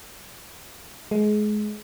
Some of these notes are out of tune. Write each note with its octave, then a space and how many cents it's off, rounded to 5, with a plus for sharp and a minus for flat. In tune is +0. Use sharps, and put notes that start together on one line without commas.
G#3 +25